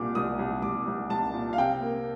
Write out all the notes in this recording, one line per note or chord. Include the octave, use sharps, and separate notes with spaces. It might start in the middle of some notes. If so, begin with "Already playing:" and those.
Already playing: C2 A#2 D6
C2 D#6
C2
C2 D6
C2
C2 A5
A#2
F5
C3 G5
A#3